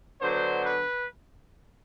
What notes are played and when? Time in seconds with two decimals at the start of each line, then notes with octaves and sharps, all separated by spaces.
0.20 D3 F#3 B3 D4 C5
0.64 B4